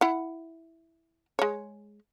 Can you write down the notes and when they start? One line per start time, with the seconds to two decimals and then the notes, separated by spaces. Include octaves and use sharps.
0.01 E4 F#5
1.39 G#3 C#5